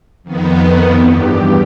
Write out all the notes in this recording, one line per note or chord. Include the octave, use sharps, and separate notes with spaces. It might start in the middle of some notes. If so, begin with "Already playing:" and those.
F2 D#3 B3
E2 G2 G4